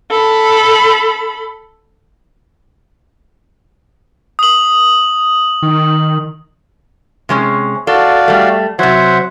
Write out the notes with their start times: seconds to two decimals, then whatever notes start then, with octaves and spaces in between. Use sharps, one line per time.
0.11 A4 B5
4.39 D#6 F#7
5.63 D#3
7.29 C3 G#3 C#4
7.87 F#4 A4 D5 F5
8.28 G3 A3
8.79 C3 F#3 C5 E5 F#5